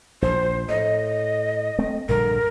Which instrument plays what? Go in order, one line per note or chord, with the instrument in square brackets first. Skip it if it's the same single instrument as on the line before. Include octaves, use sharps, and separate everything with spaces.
[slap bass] A#1 [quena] C5
[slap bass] A2 [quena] D#5
[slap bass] A3 C4
[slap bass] A#1 G2 D3 [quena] A#4